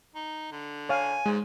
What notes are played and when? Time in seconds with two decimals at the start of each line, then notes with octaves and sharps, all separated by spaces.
0.15 D#4
0.52 D3
0.89 C#5 F5 G#5
1.26 G#2 G#3